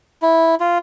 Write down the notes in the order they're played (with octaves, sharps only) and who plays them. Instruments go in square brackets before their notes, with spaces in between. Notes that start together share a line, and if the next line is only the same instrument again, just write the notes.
[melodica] E4
F4